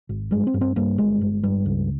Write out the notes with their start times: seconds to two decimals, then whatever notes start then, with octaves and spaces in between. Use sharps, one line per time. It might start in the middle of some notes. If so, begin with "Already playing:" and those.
0.09 G#1
0.31 G2 G#3
0.47 C4
0.54 G2
0.61 C4
0.76 G2 A#3
0.98 G1 G#3
1.21 G1
1.43 G2
1.66 C#2